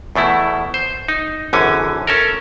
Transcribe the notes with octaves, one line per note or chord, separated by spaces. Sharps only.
E2 B2 A3 E4
C5
D#4
G#1 F#2 D3 E3 C#4 G#5
C#4 A4 A#4